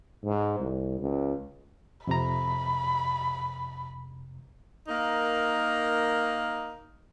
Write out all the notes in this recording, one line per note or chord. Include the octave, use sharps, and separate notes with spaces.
G#2
C2
C#2
F2 C3 A#5 B5
A#3 D#4 A#4